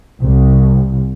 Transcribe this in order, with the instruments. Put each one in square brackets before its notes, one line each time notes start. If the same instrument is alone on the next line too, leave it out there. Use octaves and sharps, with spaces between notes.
[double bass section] C2